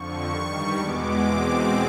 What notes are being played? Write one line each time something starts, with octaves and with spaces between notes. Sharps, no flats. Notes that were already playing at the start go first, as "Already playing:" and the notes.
Already playing: F2 D3 F3 C#6
G2 D#3 G3
E2 B2 G#3 B3 D6
E2 B2 G#3 C4